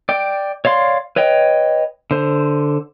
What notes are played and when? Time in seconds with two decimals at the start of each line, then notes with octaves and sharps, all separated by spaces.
0.09 D5 G5
0.65 C#5 D5 F5 C6
1.16 B4 C#5 D#5 G5
2.11 D3 C5